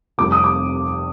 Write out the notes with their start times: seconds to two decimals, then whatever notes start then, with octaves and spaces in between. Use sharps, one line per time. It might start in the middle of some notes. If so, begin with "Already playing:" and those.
0.18 F1 F2 C3 G3 D6
0.32 D#6
0.44 D6